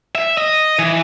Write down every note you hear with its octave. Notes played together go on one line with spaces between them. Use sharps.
E5
D#5
E3